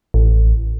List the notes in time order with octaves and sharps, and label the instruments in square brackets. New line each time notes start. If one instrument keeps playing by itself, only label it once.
[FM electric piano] A1